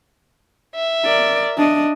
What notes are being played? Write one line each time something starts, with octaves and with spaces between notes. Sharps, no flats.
E5
A#4 D5
D4 D#5